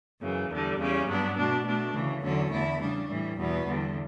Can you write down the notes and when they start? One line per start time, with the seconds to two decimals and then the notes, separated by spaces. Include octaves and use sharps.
0.21 F#2 C#3 E3
0.49 E2 D3 G3
0.79 E2 C#3 G3 C#4
1.07 G2 F#3 B3 D4
1.36 B2 A3 D4
1.65 B2 A3 D4
1.94 D2 C#3 E3
2.22 E2 D3 F#3 C#4
2.51 E2 D3 A3 E4
2.80 C#3 G3 D4
3.09 A2 E3 G3
3.38 E2 B2 G3 B3
3.66 E2 D3 G3